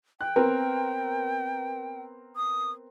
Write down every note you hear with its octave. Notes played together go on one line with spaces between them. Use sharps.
G5 F#6
B3 C4 A#4
D#6